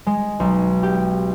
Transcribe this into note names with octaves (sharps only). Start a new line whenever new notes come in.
G#3
B1
G4